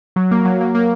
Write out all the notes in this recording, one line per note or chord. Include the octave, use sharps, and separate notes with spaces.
F#3
A#3
F#3
A#3
A#3